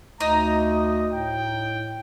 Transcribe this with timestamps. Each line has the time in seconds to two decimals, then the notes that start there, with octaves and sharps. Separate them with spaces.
0.21 D2 D#4 A#5
0.72 D#5
1.13 A2 G5